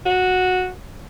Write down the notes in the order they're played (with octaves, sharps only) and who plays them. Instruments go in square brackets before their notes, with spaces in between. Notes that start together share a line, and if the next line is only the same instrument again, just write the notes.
[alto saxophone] F#4